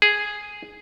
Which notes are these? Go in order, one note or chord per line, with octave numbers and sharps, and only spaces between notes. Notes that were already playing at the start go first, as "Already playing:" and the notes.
G#4